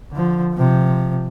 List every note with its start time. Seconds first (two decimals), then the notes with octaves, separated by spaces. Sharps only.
0.12 D3 F3
0.54 C3 F3